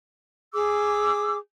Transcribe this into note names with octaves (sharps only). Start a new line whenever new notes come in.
G#4 D6 E6